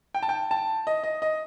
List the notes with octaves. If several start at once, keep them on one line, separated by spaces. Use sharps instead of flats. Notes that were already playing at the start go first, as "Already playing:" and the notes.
G5
A5
G5
A5
D#5
D#5
D#5